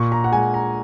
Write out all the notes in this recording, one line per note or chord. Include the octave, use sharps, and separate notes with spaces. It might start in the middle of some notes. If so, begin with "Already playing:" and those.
Already playing: A#2 C#6
A#5
F#5
G#3 G#5
A#5